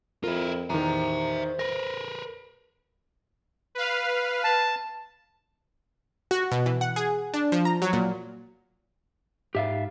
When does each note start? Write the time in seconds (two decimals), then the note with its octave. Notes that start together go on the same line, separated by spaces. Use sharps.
0.24 F2 E4 F4 A#4
0.70 E2 D#3 C5 E5 A#5
1.59 A#4 B4 A#6
3.75 B4 F5
4.44 A5
6.31 F#4
6.52 B2
6.66 E3
6.81 F#5
6.96 G#4
7.34 D4
7.52 F3
7.65 A#5
7.82 F#3
7.93 A#2
9.55 G#2 G4 E5 F5